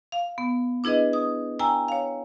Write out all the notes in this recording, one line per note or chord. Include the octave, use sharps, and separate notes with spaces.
F5
B3
D4 E4 G#4 B4 D#5
D#6
G5 G#5 A#5 E6
C#5 F5